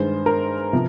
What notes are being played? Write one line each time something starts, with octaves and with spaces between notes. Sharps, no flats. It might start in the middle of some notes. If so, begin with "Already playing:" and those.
Already playing: G2 D#3 G#3 C5
A#4
C3 F3